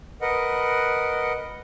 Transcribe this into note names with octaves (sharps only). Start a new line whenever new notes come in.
A#4 B4 D#5 F#5